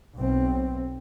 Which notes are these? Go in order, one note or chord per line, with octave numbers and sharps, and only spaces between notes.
B1 C4